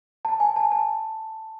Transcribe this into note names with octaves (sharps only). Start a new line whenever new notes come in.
A5
G#5
A5
A5